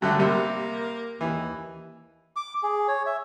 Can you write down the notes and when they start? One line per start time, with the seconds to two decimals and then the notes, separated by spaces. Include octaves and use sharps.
0.02 G2 D3 F#3 A3
0.19 C3 G3 A#3
1.21 D#2 E3
2.36 D6
2.63 G#4
2.88 C#5
3.06 E5